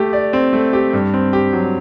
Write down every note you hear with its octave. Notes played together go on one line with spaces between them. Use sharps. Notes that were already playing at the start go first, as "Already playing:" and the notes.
Already playing: A3 G4
D5
C4
A3
G4
G2
C4
G4
F#3